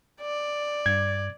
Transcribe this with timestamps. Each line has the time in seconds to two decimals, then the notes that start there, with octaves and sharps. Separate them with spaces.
0.22 D5
0.86 G2 G#6